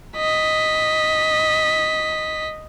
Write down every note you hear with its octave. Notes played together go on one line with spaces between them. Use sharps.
D#5 B6